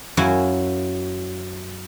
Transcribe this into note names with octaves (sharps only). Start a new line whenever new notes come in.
F#2 F#3 E4 F#4 F5 G#5